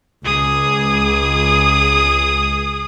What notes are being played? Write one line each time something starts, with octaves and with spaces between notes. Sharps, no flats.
C#2 G#4 D#6